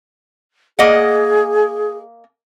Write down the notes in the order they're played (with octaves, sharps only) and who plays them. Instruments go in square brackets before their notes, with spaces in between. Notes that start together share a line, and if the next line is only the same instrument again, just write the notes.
[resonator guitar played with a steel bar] A#3 D#5 F#5 [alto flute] G#4